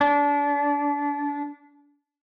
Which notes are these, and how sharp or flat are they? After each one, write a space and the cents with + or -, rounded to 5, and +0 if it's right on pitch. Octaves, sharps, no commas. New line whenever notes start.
D4 -30